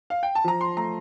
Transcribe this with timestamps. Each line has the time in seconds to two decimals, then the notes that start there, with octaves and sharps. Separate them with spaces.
0.10 F5
0.23 G5
0.35 A5
0.44 F3 A#5
0.61 C6
0.77 A3 A#5